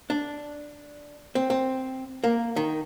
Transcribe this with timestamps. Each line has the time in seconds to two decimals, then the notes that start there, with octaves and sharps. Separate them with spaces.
0.10 D4
1.35 C4
1.50 C4
2.24 A#3
2.56 D#3